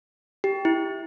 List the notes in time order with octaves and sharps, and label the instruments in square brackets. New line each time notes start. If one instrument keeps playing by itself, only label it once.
[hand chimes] G4
E4